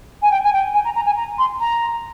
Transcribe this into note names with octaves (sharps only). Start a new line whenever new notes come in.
G#5
G5
G#5
G5
G#5
A#5
A#5
G#5
A#5
C6
A#5